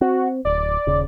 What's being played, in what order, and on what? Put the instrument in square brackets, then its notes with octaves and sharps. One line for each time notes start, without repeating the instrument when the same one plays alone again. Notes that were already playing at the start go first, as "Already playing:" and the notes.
[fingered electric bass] C4 [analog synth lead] F#4
[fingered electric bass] D1 [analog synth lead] D5
[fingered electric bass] D#1 C#3